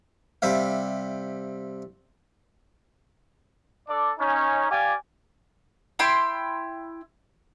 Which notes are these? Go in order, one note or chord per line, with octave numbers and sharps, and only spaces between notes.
C3 G3 C5 E5 F5
D4 A4 D5
C#4 D#4
G4 D5 F5 G#5
E4 G5 B5 C6